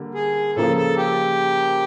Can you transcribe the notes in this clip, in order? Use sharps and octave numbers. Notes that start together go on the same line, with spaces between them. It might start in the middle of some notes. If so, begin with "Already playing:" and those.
Already playing: D3 G3 A#3
G#4
C#3 F3 A#3 A4
A4
G4